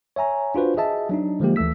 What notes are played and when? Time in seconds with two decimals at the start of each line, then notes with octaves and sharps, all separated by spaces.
0.16 C#5 E5 G#5 A#5
0.55 D4 F4 F#4 B4 C5
0.77 G#4 D#5 E5 A5
1.09 F#3 D4 D#4
1.40 D3 F3 G#3 A#3 G4
1.56 D2 E3 A3 E6 B6